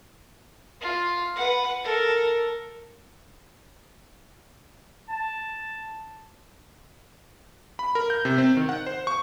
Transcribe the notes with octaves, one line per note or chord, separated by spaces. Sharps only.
F4
B4 F#5
A4 A#4
A5
B5
A#4
G6
C3
C4
D#3
F#5
C5
C#6